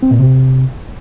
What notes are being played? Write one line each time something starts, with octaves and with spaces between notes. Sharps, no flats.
C4
A#2
C3